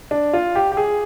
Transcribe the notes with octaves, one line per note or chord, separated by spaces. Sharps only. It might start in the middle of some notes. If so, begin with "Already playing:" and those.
D4
F4
G4
G4
G#4